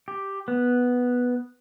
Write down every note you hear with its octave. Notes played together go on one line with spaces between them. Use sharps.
G4
B3